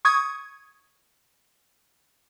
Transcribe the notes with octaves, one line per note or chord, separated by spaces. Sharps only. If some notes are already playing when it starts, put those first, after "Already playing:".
C#6 D#6 G#6